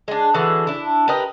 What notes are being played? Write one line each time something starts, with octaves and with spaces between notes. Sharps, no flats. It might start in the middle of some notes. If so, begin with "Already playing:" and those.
G#3 D4
D3 E3 G#3 F#4
D4 E4
G4 A#4 B4 D#5